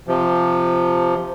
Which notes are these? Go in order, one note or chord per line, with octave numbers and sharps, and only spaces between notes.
C3 F3